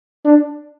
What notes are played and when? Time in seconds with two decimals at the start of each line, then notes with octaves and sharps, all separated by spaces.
0.25 D4